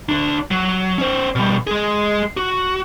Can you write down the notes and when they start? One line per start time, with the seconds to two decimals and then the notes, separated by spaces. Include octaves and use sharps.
0.09 D2 D4
0.51 F#3
0.98 C#4 C5
1.36 B2 G3
1.67 G#3 G#4
2.37 F#4